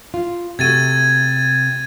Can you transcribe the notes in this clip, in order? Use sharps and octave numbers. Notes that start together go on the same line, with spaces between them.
F4
C3 A3 F#4 G#6 A6 D#7